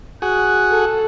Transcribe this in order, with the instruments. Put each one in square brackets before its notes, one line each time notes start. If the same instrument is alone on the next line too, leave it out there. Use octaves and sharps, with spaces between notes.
[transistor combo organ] F#4 G#4 [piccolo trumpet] F#6
[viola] A4